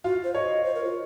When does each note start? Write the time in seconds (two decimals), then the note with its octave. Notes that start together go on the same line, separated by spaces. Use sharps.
0.04 F4 F#4
0.24 C5
0.34 C#5 D#5
0.64 C5
0.75 A#4
0.84 F4